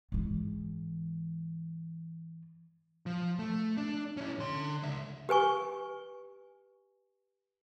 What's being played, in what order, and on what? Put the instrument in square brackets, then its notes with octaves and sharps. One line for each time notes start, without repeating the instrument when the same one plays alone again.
[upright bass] G#2 E3
[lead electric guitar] F3
A3
D4
C#4 E4
D3 C6
C#2 E5
[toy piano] G4 B4 G#5 C#6